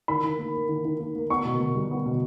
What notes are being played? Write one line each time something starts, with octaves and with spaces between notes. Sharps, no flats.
D#3 B5
D#3
A#3
A#3
D#3
D#3
A#3
A#3
B3 C#6
B2
B2
G3
B3
B2